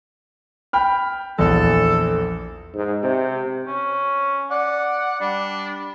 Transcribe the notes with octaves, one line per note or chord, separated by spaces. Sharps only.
G5 B5 F6
A#1 E2 A4
G#2
C3
C#4
D5 F#5
G3 D4